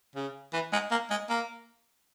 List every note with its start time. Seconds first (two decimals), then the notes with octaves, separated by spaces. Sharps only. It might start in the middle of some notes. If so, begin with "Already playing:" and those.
0.15 C#3
0.53 E3
0.72 G#3
0.91 A#3
1.10 G#3
1.29 A#3